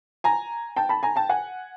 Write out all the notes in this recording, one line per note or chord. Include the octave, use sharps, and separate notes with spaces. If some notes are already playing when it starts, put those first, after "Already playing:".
G#5 A#5
G5 A5
A5 B5
G#5 A#5
G5 A5
F#5 G#5